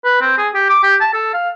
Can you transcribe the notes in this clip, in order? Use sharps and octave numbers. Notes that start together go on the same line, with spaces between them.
B4
C4
G#4
G4
D6
G4
A5
A4
F5